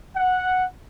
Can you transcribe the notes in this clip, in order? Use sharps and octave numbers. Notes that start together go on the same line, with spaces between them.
F#5